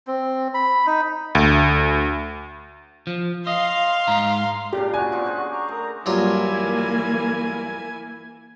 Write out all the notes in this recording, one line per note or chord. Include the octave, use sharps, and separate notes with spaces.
C4
B5
D#4
D2
F3
D#5 F5 C6
G#2 A#5
A#2 C#3 D4 G4
A#2 F#4 G#5 F#6
F3 B3
G#4 C5 F#5
A#5 C#6 D6
A3 A#4 A#5 D#6
G2 E3 F#3 A#3 E4 F4 G#5